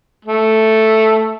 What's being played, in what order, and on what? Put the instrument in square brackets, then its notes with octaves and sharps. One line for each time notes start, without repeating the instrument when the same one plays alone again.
[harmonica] A3